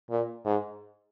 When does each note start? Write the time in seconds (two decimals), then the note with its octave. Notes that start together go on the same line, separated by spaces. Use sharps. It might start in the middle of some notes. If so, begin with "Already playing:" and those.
0.10 A#2
0.45 G#2